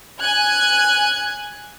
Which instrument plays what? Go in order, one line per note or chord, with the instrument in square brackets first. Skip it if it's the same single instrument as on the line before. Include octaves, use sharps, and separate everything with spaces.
[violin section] G#5 F#6 G#6